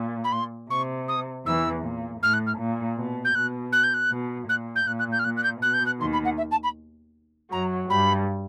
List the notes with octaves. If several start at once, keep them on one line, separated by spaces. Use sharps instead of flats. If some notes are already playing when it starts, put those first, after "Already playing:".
Already playing: A#2
B5
C6
C3 C#6
D#6
E2 E3 E6
A#2
A2 F6
F#6
F6
A#2
B2
G6
B2 F#6
F#6
G6
F#6
B2
A#2 F#6
G6
A#2 F#6
F#6
G6
F6
A#2 F#6
F#6
G6
B2 F#6
G6
F#6
D#2 D#3 C6
B5
F#5
E5
A5
B5
F#2 F#3 A#5
G2 G3 B5